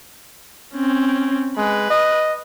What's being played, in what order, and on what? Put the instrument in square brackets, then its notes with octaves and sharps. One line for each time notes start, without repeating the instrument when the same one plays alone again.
[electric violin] C4 C#4
[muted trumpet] G#3 [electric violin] B4
[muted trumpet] D#5